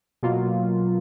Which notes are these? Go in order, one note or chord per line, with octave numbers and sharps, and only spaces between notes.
B2 F#3 A#3 F4